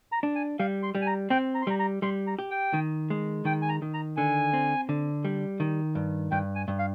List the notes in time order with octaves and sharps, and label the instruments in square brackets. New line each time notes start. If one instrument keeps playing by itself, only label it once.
[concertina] A#5
[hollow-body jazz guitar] D4
[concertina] G#5
[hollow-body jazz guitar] G3 [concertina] F5
[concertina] C6
[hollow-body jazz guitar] G3
[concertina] G#5
A#5
[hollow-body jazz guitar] C4 [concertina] G5
[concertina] A#5
C6
[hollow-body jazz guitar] G3 [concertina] A#5
[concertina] A#5
[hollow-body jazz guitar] G3 [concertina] C6
[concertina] A#5
[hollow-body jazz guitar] G4
[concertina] G5
[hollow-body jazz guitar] D#3
G#3
[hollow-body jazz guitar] D#3 [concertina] G5
[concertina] G#5
A#5
[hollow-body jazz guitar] D#3
[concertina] A#5
[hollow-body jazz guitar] D3 [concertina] G#5
[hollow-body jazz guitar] C4
D3
G3
D#3
G2
[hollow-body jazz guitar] G2 [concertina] G5
[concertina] G#5
[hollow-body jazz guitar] G2
[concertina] F5